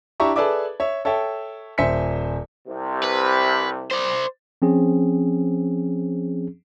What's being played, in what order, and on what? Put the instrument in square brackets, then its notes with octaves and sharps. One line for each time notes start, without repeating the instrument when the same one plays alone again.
[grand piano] D4 E4 G4 E5 A#5 C#6
G#4 A4 B4 D5 E5 D6
C#5 E5
A4 C#5 E5 G5
D#1 C5 E5 G#5 B6 C#7
[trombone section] C2 C3
[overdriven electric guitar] B4
C5 D5
[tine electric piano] F3 C4 C#4 G#4